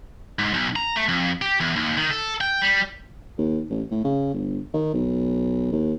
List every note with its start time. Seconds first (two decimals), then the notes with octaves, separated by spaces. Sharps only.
0.39 G#2
0.54 B1
0.76 A#5
0.96 A3
1.09 F2
1.42 G4
1.60 E2
1.76 D#2
1.97 D#3
2.10 A4
2.41 G5
2.61 G3
3.38 D#2
3.70 A1
3.91 A2
4.04 C#3
4.34 G1
4.74 D#3
4.94 B1
5.72 D#2